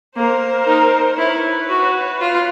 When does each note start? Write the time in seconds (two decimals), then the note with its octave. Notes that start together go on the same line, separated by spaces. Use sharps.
0.15 A#3 A#4 C5
0.67 D#4
1.18 E4 B4 C#5
1.69 F#4
2.21 F4